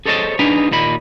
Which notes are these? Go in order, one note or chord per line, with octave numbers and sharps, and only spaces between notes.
G#4 A4 C5 C#5 D#5 A5
D4 D#4 G#4 B4 A#5
D#2 A#2 D#4 B5